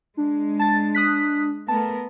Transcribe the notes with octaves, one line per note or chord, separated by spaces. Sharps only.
G#3 D4
A5 A6
D#6 F#6 B6
A3 B3 A#4 A5